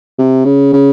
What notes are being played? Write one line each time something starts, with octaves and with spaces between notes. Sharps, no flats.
C3
C#3
C#3